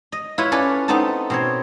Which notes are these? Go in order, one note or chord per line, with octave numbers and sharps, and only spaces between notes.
D#5
E4 F4 B4 C#5
C#4 A4 B4 D5
B3 C4 D#4 A4 A5
B2 C4 C#5